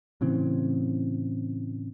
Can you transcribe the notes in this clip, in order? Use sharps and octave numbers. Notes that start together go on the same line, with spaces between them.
A2 C#3 E3 C4